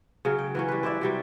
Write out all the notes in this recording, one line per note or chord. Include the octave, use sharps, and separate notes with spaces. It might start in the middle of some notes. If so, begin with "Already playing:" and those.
C#3 F#3 F5
G5
E3 F#3 C#4
G3 B4
E4 C5 D5 E5
C3 F#3 G3